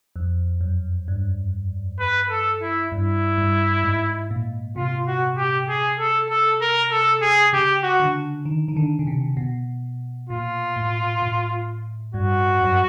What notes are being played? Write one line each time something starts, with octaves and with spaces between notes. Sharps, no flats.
F2
F#2
G2
B4
A4
E4
G2 E4
G2
G#2
A#2
C3 F4
F#4
G4
G#4
A4
A4
A#4
A4
G#4
C#3 G4
F#4
D3
D#3
D#3
D3
C#3
C3
B2
A#2 F4
A2
A2
G2 F#4
F#2